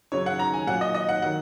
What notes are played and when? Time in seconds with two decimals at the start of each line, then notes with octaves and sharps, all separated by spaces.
0.12 F#2 C#3 F#3 C#5
0.26 F#5
0.39 A#5
0.53 G#5
0.67 A#2 F#3 F#5
0.81 D#5
0.94 D#5
1.09 F#5
1.22 D#3 F#3 F#5